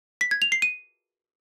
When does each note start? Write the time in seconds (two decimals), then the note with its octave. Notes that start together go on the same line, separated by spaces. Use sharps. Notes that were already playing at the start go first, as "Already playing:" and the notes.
0.21 B6
0.31 G#6
0.42 F7
0.52 C7
0.62 D#7